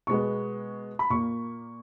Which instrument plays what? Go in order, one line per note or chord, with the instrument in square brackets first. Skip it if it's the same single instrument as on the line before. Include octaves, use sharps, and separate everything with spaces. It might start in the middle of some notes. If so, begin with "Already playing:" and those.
[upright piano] B2 G#3 B3 C#6
B5
A#2 A#3 C#6